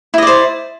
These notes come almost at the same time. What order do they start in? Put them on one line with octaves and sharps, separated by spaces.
E4 D#5 D5 C5